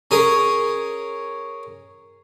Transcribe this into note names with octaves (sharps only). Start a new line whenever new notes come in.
C#4 G#4 A#4